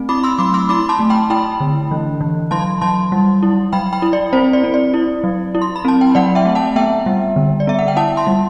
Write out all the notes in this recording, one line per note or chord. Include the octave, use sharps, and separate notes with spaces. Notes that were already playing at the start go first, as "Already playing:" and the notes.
Already playing: A3 C4
E4 B5 D6
C6 E6
F#3 B5 D6
C6 E6
E4 B5 D6
A5 C6
A3
G5 B5
E4 G5 B5
D3
E3
E3
F#3 A5 C6
F#3 A5 C6
G3
E4
F#3 G5 B5
G5 B5
E4
D5
C4 C5
D5
C4
D5
E4
F#3
E4
C6
B5
C4 A5
G5
F#3 D5 F#5
E5 G5
A3
F#5 A5
B3 E5 G5
G3
D3
D5
B3 E5
F#5
G5
E4 F#5 A5
A5 C6
G3